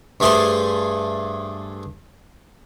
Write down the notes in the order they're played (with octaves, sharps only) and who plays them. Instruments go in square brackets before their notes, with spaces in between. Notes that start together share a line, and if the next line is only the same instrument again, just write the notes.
[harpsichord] G2 A3 G#4 C5 C6